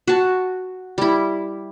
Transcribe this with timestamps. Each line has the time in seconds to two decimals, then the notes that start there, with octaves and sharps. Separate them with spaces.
0.08 F#4 A5
0.98 G3 E4